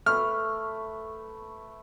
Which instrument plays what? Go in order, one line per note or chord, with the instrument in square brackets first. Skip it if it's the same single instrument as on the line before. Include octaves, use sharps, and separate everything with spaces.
[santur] A3 B4 [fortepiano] F6